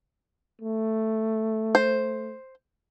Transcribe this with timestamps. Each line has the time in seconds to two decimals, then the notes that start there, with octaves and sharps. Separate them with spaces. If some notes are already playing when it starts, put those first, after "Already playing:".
0.61 A3
1.75 C5